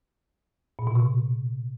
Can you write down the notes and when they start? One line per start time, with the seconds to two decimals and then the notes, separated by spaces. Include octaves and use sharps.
0.79 A#2
0.87 B2
0.95 C3